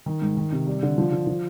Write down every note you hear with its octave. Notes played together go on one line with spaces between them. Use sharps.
D#3
G#2
D#3
C3
G3
D3
F3
D3
F3